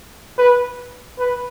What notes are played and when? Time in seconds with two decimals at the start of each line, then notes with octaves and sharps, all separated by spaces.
0.38 B4
1.19 B4